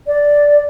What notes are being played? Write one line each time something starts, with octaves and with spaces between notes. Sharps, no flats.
D5